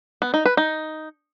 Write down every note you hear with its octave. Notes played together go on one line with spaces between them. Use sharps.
B3
D#4
B4
D#4